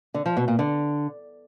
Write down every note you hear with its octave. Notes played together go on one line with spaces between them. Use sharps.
D3
F3
B2
A#2
D3